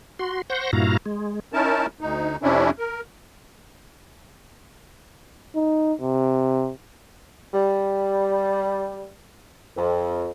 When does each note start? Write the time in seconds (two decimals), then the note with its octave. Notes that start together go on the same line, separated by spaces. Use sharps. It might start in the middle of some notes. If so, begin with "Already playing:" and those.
0.19 F#4 C6
0.50 C5 F#5 C6 C#6 G6 A#6
0.73 G2 A#2 E4 F#4 F5 A#5
1.06 G#3
1.53 C#4 D#4 E4 A#4 A5
2.01 D2 D#4
2.43 F2 C3 C#4 D4 E4
2.79 A#4
5.56 D#4
6.01 C3
7.54 G3
9.77 F2